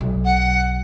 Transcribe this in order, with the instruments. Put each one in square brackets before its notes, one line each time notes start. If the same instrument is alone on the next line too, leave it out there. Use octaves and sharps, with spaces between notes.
[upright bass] B1
[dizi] F#5